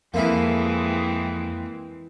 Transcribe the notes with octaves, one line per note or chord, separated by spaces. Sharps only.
F2 E3 G#3 A#3 C4 E4 A#4